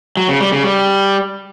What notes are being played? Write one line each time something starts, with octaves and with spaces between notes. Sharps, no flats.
F#3
C#3
G3
C#3
G3